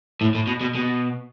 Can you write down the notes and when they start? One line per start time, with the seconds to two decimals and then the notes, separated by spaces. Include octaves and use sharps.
0.21 A2
0.35 A2
0.47 B2
0.61 B2
0.75 B2